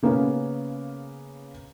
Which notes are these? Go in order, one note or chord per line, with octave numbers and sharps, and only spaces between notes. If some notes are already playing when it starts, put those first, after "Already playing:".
C#3 A#3 B3 C#4